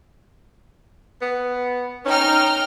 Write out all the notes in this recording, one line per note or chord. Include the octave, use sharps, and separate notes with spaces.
B3
C#4 D#4 G5 F6